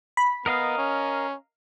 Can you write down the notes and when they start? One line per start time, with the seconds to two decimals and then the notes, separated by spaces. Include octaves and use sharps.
0.17 B5
0.46 B3 A#4 D#5 F5
0.78 C#4